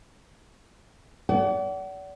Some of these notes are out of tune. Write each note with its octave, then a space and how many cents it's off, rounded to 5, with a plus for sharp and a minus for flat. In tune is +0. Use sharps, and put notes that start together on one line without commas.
D5 -35 F#5 +30